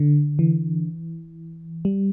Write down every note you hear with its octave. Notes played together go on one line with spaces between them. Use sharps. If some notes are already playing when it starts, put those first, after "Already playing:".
Already playing: D3
E3
G3